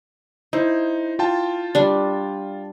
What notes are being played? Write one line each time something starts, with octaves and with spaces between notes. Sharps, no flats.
D#4 E4 C5
F4 G5 A5
G3 D4